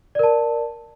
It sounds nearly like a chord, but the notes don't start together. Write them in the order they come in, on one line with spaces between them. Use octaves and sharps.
D5 A#4 A5